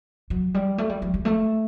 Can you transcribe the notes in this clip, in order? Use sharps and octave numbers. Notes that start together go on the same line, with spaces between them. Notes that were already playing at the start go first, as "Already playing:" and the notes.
F#3
G3
A3
G3
F#3
G3
A3